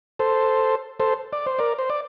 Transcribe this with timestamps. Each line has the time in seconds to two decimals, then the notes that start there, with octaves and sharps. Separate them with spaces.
0.19 A4 C5
1.00 A4 C5
1.33 D5
1.46 C5
1.59 A#4 D5
1.79 C5
1.90 D5